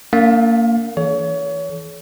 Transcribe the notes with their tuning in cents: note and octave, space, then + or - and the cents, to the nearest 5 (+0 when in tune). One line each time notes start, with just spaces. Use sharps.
A#3 -25 D4 -45 F5 +25
E3 +0 A4 -45 C#5 +30